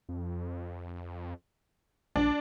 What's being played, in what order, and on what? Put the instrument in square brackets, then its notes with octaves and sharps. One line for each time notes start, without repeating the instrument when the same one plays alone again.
[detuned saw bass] F2
[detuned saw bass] A#1 [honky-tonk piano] D4